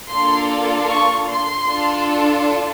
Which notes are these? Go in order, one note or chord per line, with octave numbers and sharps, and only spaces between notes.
A#3 D4 F4 A4 C6
C#6
C6
D4 F4 A4